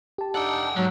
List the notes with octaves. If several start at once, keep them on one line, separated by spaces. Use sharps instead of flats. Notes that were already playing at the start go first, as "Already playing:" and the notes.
G4 A5
D4 D#4 A4 F#5 G5
G#2 F#3